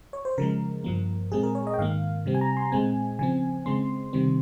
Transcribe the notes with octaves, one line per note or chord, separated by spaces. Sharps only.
C#5
C5
C#3 F3 G#3 A#4
G2 F3 A#3
A#2 G#3 C4 G#4
A#4
C#5
D#5
G5
G#2 D#3 A#3 F5
C3 G3 C4
G#5
A#5
C6
A#2 G#3 C4 G#5
C#3 F3 C4 G#5
C#3 G#3 C4 C6
C3 D#3 G3 C4